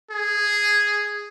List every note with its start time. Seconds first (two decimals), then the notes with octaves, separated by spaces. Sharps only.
0.11 G#4